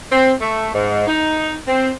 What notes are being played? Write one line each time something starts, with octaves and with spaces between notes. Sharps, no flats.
C4
A3
G#2
D#4
C4